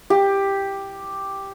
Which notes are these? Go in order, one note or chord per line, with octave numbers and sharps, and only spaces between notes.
G4